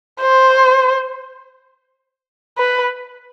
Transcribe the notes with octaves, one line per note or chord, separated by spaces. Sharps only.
C5
B4